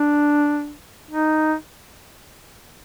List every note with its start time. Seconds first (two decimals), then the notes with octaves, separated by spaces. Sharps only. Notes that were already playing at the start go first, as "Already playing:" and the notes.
Already playing: D4
1.11 D#4